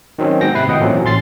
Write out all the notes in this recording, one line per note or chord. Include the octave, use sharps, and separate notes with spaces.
D#3 F#3 C4 C#4
G#2 B3 G5 A#6
C3 C4 E4 B4 C7
G#1 A2 D#5 F#5 G5
A#2 E3 F#3 A3 C4 C#4
A1 C#4 C6 A6 C7